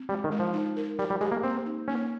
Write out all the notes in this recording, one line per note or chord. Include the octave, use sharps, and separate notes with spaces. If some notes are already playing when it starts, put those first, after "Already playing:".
Already playing: C4
G3 G#3
D#3
G#3
F3
D#4
A#4
G3 A#4
G3
G#3 G4
A#3
A#3 C4
D#4
A#3 C#4